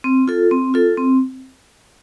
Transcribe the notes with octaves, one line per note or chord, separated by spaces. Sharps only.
C4
F4 A4
C4
F4 A4
C4